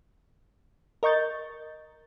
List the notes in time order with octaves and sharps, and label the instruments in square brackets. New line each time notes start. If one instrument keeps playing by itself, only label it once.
[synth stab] A#4 D#5 C#6 G6 A6